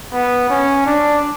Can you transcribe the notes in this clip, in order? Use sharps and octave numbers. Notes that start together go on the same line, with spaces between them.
B3
C#4
D4